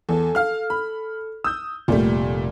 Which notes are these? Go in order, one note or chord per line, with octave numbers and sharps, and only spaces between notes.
E2 A4
F5 F6
B5
D#6 E6 G6
F1 A#2 G3 A3